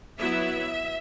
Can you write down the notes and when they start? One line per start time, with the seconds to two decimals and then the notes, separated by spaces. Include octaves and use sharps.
0.19 F#3 B3 E4 E5